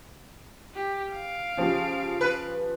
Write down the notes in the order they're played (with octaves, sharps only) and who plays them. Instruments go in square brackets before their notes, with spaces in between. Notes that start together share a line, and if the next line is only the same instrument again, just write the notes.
[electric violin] G4
F5 D7
[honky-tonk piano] C#3 F3 G4
[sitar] B4